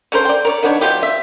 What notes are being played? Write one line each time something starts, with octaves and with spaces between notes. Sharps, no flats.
C#4 A4 A#4 C5
D5 G5
A#4 C#5 D5
D#3 B3 D4 C#5
B2 F3 F4 G4
E5